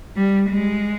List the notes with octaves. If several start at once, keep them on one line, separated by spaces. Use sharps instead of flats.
G3
G#3